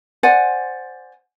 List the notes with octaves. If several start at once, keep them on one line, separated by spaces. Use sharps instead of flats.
C5 D5 F#5 G#5